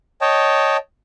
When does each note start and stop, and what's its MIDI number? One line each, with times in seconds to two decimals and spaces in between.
0.21 0.77 73
0.21 0.77 75
0.21 0.77 79
0.21 0.77 81